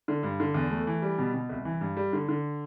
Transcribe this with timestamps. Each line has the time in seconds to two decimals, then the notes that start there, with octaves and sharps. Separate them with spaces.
0.08 D3
0.23 G2
0.40 D3
0.54 E2
0.71 A3
0.87 E3
1.02 G3
1.18 B2
1.34 B2
1.50 C2
1.65 E3
1.81 G2
1.97 G3
2.13 D3
2.29 D3